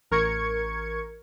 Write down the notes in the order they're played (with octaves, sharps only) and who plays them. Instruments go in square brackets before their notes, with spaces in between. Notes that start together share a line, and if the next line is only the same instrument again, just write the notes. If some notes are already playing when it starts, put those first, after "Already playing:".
[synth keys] A1 A#4 C#6 G#6 C#7